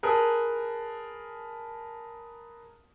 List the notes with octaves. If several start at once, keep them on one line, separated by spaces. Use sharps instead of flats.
G#4 A#4 B4 A5